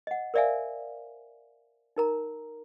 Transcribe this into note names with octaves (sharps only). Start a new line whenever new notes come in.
D#5 F#5
A#4 C5 D5 E5 F5 G#5
D#4 A#4 A#5